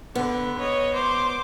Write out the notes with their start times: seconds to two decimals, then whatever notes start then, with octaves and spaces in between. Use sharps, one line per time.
0.15 D3 B3
0.58 C#5 D#5
0.94 C5 D6